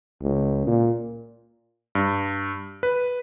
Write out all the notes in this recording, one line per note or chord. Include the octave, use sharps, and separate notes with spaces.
C#2
A#2
G2
B4